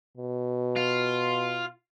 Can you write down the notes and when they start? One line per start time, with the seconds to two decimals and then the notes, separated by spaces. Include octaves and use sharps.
0.18 B2
0.77 F4